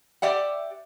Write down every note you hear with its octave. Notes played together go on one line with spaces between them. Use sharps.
G4 D5 E5 F#5